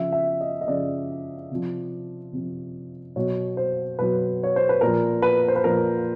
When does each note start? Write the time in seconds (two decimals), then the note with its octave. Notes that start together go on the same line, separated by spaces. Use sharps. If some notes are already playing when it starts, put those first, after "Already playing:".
Already playing: C#3 F3 E5
0.12 E5
0.41 D#5
0.61 D#5
0.68 C#3 F3 D5
1.51 C3 F3
2.33 C3 F3
3.16 B2 F#3 C#5
3.57 C5
3.98 B2 F#3 B4
4.43 C#5
4.56 C5
4.69 B4
4.81 A#2 F3 A#4
5.22 B4
5.48 C5
5.56 B4
5.64 A#2 F3 A#4